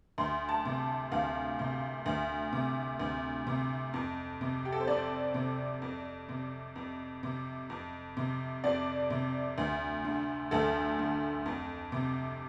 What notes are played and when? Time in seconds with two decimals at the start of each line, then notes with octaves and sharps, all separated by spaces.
0.18 D2 C6
0.49 A5
0.65 C3
1.12 D2 F5
1.59 C3
2.06 D2
2.53 C3
3.00 D2
3.47 C3
3.94 F2
4.41 C3
4.65 G4
4.72 A4
4.80 C5
4.87 F2 D5
5.34 C3
5.82 F2
6.29 C3
6.76 F2
7.23 C3
7.70 F2
8.17 C3
8.64 F2 D5
9.10 C3
9.58 D2
10.04 D3
10.51 D2 A4
10.99 D3
11.46 F2
11.92 C3